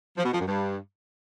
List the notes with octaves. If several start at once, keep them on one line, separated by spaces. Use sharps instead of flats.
F3
B2
F3
F#2
G2